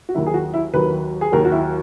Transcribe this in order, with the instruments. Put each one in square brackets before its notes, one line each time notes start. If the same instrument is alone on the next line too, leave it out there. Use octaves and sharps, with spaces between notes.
[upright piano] F#4
D#2 D#3 F#3 E4
G#4
F#4
E4
D#2 D#3 F#3 B4
G#4
D#2 D#3 F#3 A#4
F#4
E4